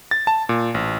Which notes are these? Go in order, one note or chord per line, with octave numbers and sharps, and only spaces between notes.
A6
A5
A#2
A1